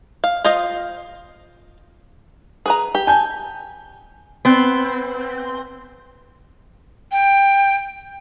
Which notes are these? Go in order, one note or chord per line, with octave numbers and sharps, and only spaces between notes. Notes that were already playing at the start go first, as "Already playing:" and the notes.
F5
F4 C5 D#5 F5
G#4 B4 A#5
G4
G#5 A5 G6
B3 C4
G5